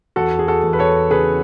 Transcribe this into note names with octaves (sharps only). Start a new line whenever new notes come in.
E2 F#4 A4
G#4
F#4 A4
E2
B4
A4 C#5
C#3 G#4 B4